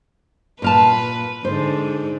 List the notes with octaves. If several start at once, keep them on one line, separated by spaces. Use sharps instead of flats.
A#2 B4 F5 A5
G#2 D3 C5